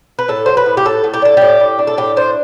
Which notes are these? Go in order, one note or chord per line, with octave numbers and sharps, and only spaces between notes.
B4
A2 A4
F#3 C5
B4
A2
G4
A2 A4
A2
G4
D4 A4
A2 G4
A2
D4
A4
A2 G4
D4 C5